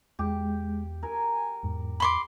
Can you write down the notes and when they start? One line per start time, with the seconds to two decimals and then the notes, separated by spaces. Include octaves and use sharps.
0.19 E2 G#3 G4
1.03 A#4 G#5
1.63 E2 G#2
2.00 B5 C6 D6